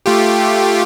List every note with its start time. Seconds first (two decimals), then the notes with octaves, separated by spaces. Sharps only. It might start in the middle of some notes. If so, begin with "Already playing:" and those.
0.06 A3 F4 G4